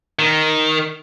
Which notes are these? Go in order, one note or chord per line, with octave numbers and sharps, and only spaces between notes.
D#3